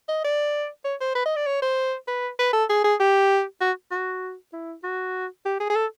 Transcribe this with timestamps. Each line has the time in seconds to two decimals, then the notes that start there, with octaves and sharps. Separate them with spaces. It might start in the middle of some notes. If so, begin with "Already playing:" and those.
0.09 D#5
0.24 D5
0.85 C#5
1.01 C5
1.15 B4
1.26 D#5
1.36 D5
1.46 C#5
1.62 C5
2.08 B4
2.39 B4
2.53 A4
2.69 G#4
2.84 G#4
3.00 G4
3.61 F#4
3.91 F#4
4.53 E4
4.83 F#4
5.45 G4
5.60 G#4
5.70 G#4
5.75 A4